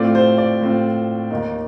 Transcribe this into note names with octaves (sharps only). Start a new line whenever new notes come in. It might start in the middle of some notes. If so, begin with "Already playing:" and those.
Already playing: A2 A3 C4 F4 D5
C5
D5
A2 A3 C4 F4
D#2 D#3 A#3 D#4